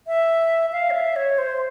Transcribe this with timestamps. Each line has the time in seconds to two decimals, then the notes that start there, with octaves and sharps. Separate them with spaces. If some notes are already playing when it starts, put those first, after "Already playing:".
0.07 E5
0.72 F5
0.90 C#5
0.94 E5
1.16 C#5
1.38 C5